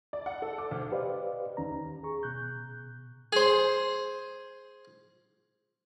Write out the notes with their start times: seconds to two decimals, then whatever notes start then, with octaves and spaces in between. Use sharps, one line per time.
0.13 D5
0.26 F#5
0.42 A4
0.58 D6
0.71 D2
0.92 G4 B4 C5 D5 D#5 F5
1.57 D#2 D#3 C#4 A#5
2.03 G#4 A#5 C#6
2.23 B2 F#6 G6
3.33 G#4 C5